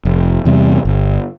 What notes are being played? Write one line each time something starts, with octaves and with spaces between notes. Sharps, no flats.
F1
E2 C3 G3
G1